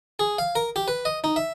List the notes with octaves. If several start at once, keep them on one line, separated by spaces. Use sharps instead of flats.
G#4
F5
A#4
G4
B4
D#5
D#4
E5